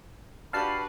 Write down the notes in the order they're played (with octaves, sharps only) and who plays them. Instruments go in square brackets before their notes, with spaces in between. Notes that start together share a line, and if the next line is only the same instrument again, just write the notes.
[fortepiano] D4 F#4 G4 [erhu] B4 [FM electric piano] F5 A5 C7